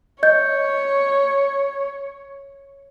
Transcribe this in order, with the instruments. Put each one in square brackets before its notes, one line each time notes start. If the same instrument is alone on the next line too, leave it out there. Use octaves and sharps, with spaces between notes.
[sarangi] C#5 [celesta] D#5 G6